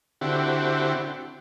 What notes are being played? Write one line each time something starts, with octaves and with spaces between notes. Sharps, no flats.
D3 C4 E4 F#4 G4